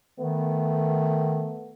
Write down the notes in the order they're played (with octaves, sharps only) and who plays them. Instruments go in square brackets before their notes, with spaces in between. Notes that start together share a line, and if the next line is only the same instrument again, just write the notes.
[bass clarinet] D#3 [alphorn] A3 [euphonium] B3